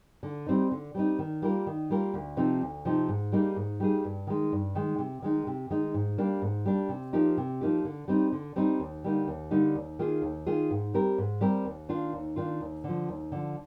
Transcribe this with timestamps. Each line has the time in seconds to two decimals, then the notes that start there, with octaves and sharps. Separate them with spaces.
0.23 D3
0.46 G3 C4 D#4
0.71 D3
0.95 G3 C4 D#4
1.19 D#3
1.42 G3 A#3 F4 A#4
1.67 D#3
1.90 G3 A#3 F4 A#4
2.14 D2
2.37 C3 F3 C4 D#4
2.61 D2
2.85 C3 F3 C4 D#4
3.09 G#2
3.32 G3 A#3 D#4 G#4
3.56 G#2
3.80 G3 A#3 D#4 G#4
4.05 G2
4.27 D#3 G#3
4.52 G2
4.75 D#3 G#3
4.98 C3
5.22 D#3 G#3 D#4
5.47 C3
5.70 D#3 G#3 D#4
5.94 G#2
6.18 G3 A#3 D4
6.42 G#2
6.65 G3 A#3 D4
6.89 C3
7.13 F3 A#3 D#4 G4
7.37 C3
7.61 F3 A#3 D#4 G4
7.85 D3
8.08 G3 C4 D#4
8.32 D3
8.56 G3 C4 D#4
8.80 D#2
9.04 D3 G3 A#3 D#4
9.28 D#2
9.51 D3 G3 A#3 D#4
9.75 D#2
9.99 D#3 A#3 F4 G#4
10.22 D#2
10.47 D#3 A#3 F4 G#4
10.71 G#2
10.94 G3 C4 G4 A#4
11.18 G#2
11.41 G3 C4 G4 A#4
11.65 D#2
11.89 D#3 A#3 D4 F4
12.13 D#2
12.36 D#3 A#3 D4 F4
12.61 D#2
12.84 D3 F3
13.08 D#2
13.32 D3 F3